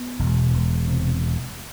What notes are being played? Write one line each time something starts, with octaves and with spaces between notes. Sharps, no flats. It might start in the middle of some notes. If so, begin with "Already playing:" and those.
Already playing: B3
E1
E1
C3